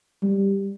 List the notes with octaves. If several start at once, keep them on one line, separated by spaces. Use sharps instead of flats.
G3